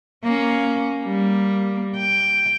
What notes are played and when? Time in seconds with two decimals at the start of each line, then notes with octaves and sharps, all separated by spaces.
0.24 A#3 C#4
1.04 G3 A#3
1.97 G5